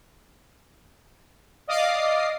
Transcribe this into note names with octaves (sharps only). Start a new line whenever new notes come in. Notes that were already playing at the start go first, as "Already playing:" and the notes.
D5 D#5 F5 D6 D#6 C7